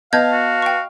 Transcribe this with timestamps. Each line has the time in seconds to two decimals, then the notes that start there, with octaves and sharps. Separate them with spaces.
0.13 B3 D#5 F5 A5 G6 G#6
0.32 F#4
0.62 G5 C#6